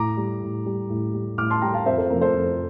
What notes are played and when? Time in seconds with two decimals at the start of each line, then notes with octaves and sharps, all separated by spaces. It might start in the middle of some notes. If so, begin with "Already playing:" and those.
Already playing: A2 A#5 D6
0.17 G3
0.42 A2
0.66 G3
0.89 A2
1.14 G3
1.37 A2 D6 F6
1.50 A5 C6
1.62 G3 G5 A#5
1.74 F5 A5
1.86 F2 C5 E5
1.98 A4 C5
2.10 C3 F3 A3 A#4
2.21 A4 C5
2.34 F2